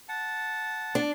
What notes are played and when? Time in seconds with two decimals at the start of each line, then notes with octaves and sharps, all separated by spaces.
0.09 F#5 A5
0.95 D4